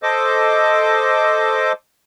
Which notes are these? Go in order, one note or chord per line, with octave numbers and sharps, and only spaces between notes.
A4 C5 D#5 D6